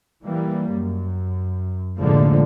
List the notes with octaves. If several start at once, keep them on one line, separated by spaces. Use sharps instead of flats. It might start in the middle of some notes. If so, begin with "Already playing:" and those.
E3 G3 A#3
F#2
F1 A2 D3 F3 G#3 A#3